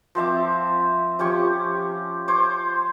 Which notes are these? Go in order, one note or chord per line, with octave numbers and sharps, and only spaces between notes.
F3 C4 E5 D6
F3 C#4 G4 C#6
C5 C#5 D6